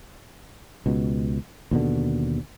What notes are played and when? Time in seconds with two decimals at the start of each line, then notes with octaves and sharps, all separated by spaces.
0.86 C#2 B2
1.71 D#2 B2 D3